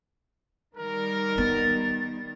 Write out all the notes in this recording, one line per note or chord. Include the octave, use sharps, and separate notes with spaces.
D#3 G3 A#4
B3 A6